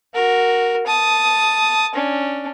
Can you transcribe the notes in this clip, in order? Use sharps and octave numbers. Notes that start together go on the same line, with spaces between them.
F#4 A#4
A5 D#6
C#4 D4